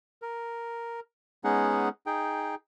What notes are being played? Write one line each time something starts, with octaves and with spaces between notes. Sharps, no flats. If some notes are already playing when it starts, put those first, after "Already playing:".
A#4
G#3 B3 C#4 D#4 G#4 F#5
D#4 G#4 G5